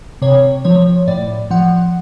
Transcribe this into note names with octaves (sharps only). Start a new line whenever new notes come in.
C3 C#5
F3 C#5
A2 D5
F3 F#5